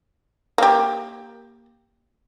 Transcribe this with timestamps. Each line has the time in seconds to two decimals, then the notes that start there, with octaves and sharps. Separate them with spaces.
0.58 A#3 G4